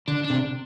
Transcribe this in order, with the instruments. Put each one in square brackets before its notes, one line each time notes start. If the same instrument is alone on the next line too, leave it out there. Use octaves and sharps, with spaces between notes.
[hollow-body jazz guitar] D3 [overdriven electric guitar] D4
[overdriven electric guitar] D4
[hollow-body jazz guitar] C3